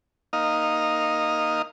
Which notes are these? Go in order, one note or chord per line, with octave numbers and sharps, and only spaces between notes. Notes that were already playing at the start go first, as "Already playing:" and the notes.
A#3 D#4 D#5 F5